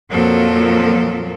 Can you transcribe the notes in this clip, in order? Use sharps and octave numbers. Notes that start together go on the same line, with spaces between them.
F2 A#2 F3 F#3 A4 A#4